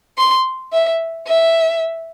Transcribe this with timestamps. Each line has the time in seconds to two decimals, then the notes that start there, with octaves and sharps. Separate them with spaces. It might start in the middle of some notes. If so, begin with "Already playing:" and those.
0.18 C6
0.73 E5
1.27 E5